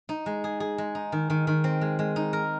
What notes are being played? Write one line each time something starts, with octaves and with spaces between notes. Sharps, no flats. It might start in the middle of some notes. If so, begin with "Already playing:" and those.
D#4
G#3
G#4
G#4
G#3
D#4
D#3
D#3
D#3
C4
G#3
G#3
D#4
A#4